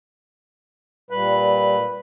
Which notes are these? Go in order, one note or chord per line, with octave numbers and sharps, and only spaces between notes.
A#2 G3 B4